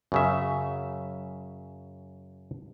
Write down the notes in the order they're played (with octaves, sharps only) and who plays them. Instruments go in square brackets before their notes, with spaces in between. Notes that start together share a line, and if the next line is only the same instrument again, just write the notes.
[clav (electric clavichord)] F#2 C#3 E5